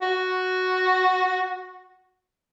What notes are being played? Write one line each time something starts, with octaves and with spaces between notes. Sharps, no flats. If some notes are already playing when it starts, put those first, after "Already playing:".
F#4